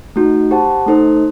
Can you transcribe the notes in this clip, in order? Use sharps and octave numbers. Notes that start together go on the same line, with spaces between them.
A3 D#4 F#4
G4 C5 F#5 A5
A3 D#4 A4 C5